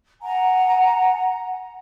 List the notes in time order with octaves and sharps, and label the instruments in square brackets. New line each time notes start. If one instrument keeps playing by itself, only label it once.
[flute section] F#5 G#5 A#5